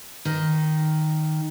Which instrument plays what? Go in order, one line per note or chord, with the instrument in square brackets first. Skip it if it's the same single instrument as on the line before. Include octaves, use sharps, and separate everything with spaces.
[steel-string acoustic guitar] D#3